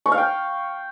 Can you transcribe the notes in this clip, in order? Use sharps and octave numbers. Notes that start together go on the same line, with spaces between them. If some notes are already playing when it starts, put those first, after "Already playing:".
C#6
F5
G5